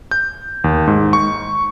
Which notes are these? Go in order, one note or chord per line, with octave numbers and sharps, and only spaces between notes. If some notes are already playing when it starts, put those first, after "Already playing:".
G6
D#2
G#2
C#6